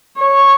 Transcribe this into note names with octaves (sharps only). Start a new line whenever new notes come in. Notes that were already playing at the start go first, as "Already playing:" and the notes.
C#5